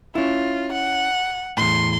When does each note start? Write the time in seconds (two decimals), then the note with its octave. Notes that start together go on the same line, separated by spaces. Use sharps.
0.15 C#4 E4 F4
0.73 F#5
1.57 E2 A2 C6